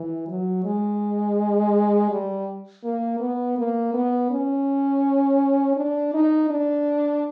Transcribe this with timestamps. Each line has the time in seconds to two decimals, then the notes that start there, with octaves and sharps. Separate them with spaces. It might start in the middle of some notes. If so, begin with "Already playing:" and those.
Already playing: E3
0.28 F#3
0.64 G#3
2.10 G3
2.84 A#3
3.20 B3
3.58 A#3
3.94 B3
4.31 C#4
5.77 D4
6.14 D#4
6.50 D4